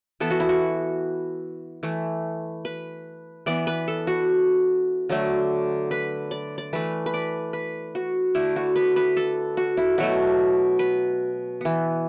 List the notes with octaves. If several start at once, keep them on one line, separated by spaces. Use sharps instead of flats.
E3 B3 A4
F#4
E4
F#4
E3 A3
B4
E3 B3 D5
B4
A4
F#4
D3 F#3 A3
B4
D5
D5
E3 A3 B4
B4
D5
B4
F#4
D3 A3 E4
F#4
B4
B4
A4
F#4
E4
B2 F#3 A3 F#4
B4
E3 B3